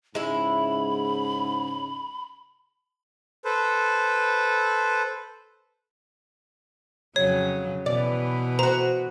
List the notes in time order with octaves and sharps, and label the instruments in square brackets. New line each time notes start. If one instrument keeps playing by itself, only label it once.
[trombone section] G#2 C#3 [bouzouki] G#3 E4 [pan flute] B5
[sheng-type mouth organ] A4 B4 C5
[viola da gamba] F2 C#3 F#3 [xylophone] C#5
[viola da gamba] B2 E3 [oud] D5
[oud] F#4 C5 [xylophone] A#5